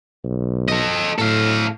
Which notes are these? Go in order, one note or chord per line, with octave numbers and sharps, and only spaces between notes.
B1
A4 D#5
A2 A4 F5